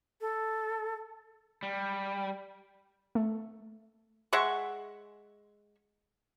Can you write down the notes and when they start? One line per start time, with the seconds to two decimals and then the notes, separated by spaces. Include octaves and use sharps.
0.21 A4
1.63 G3
3.15 A3
4.33 G#3 E5 F#5 C#6